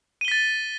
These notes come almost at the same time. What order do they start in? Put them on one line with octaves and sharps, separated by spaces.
D#7 G7 B6 A6